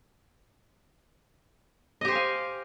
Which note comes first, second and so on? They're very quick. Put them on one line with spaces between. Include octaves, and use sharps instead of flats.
D#5 G4 C5 G#5 F5